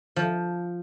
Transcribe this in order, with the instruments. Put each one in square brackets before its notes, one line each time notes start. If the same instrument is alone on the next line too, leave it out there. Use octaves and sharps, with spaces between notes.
[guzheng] F3